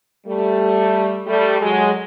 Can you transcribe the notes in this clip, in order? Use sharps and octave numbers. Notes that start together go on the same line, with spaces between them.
G3 A3
G3 A3
F#3 G#3